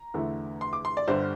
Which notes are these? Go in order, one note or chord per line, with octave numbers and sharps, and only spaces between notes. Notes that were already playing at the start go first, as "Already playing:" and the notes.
Already playing: A#5
E2 D3 A3 E4
C6
D6
C6
D5
G1 G2 D3 G3 C5